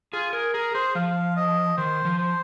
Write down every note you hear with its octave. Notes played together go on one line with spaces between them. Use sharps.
F4 G#4
G#4 A#4
G#4 A#4
G#4 C5
F3 F5
D#5
D#3 C5
F3
C5